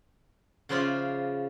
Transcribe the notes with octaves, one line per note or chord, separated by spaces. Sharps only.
C#3 F3 E4 F4 D5